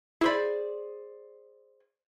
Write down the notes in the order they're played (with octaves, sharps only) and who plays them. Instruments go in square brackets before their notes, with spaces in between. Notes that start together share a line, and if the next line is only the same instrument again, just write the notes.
[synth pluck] E4 B5 [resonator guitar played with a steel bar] G#4 C5 D5